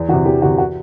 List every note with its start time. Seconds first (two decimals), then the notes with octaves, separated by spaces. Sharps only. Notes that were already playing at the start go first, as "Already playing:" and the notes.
Already playing: E2
0.09 E3 F#4
0.13 C3
0.25 E2 G4
0.42 C3 E3 F#4
0.58 F#4